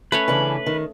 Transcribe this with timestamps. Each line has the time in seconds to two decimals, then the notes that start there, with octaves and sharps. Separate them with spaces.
0.12 A3 C#4 B4 C#5
0.28 C#3 E3 D4
0.66 D#3